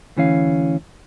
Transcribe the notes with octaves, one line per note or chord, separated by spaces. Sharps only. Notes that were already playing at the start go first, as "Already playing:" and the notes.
D2 E3 C#4 F5